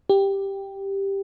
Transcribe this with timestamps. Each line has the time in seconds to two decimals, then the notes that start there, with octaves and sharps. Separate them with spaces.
0.09 G4